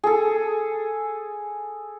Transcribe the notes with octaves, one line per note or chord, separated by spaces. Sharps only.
G#4 A4